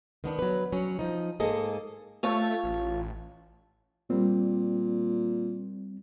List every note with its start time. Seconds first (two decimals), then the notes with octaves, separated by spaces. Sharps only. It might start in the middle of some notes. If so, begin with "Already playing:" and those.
0.24 D#3 B3 D4
0.39 F#3 B4
0.72 F#3 C#4
0.99 F3 D#4
1.40 G#2 A#3 G#4 A4 D#5
2.23 A3 F4 C#5 A5
2.64 A1
4.10 A#2 G3 C4